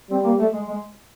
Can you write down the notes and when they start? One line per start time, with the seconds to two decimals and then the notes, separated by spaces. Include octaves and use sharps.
0.10 G3 C4
0.24 A#3
0.39 A3
0.53 G#3
0.68 G#3